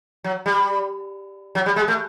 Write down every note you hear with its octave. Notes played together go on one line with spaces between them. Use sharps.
F#3
G3
F#3
G3
G#3
A3